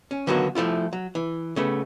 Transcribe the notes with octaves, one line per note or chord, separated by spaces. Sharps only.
C#4
D3 D#3 F#3 A#3 B3 F#4
F3 A3 E4 F4
F#3
E3
C#3 A3 B3